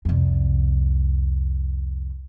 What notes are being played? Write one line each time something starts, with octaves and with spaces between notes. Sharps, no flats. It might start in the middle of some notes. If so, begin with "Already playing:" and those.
C2 F2